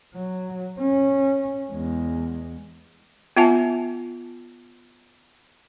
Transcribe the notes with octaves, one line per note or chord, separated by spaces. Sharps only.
F#3
C#4
E2 G#3
B3 F4 E5 F#5 G#5 A5